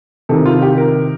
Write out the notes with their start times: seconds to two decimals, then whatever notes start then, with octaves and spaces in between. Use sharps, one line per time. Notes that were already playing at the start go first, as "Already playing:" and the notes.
0.29 C3 D#3 A4
0.46 F4
0.62 G4
0.78 A#4